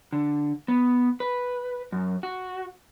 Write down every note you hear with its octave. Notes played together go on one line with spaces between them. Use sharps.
D3
B3
B4
F#2
F#4